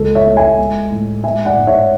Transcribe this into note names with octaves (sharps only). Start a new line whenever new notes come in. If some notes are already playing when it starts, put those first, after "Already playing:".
Already playing: C#2 G#3 A4
C#5 E5
A3
E5 G#5
G#3
A2
G#3 E5 G#5
D5 F#5
G#2
C#5 E5